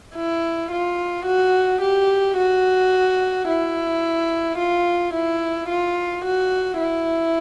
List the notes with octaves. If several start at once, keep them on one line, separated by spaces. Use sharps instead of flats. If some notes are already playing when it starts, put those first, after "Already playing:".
E4
F4
F#4
G4
F#4
E4
F4
E4
F4
F#4
E4